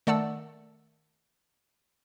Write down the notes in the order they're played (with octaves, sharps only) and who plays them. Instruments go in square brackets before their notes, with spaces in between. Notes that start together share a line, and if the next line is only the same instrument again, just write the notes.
[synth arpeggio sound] D#3 A3 D5 F#5 A5 E6